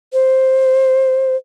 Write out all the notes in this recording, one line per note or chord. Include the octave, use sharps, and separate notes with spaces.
C5